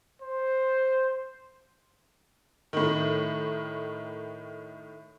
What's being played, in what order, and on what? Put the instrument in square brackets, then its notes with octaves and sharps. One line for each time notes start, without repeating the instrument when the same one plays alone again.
[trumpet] C5
[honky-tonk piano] A2 D#3